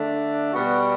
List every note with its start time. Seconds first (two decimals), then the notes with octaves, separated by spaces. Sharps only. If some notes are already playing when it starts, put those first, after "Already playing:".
Already playing: D3 A3 D4
0.53 B2 G3 B3 F#4